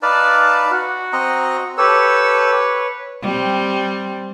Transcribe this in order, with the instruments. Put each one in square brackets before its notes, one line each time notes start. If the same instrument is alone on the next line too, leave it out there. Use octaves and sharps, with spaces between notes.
[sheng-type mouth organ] D#4 A5 [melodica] B4 D5 F5
[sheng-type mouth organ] F#4
[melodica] C4 D#5 A#5
[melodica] G4 A4 E6 [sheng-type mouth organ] B4 C#5
[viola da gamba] G3 C4